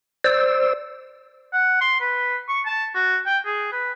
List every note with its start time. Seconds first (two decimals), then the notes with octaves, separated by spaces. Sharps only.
0.24 C5 D5 E6
1.53 F#5
1.81 C6
2.00 B4
2.49 C#6
2.66 A5
2.95 F#4
3.26 G5
3.45 G#4
3.72 B4